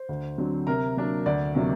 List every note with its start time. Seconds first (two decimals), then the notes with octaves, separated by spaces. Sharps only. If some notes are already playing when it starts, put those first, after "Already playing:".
Already playing: C5
0.09 D2
0.38 D3 F#3 C4
0.67 C3 A#4 A#5
0.97 F#3 A#3 D4
1.26 D2 D5
1.55 C3 D#3 F#3 A#3